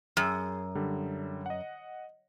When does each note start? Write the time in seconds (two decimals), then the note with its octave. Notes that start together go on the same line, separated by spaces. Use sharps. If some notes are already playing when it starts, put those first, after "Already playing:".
0.17 F#2 G#4 G5
0.75 D3 G3
1.46 D#5 F#5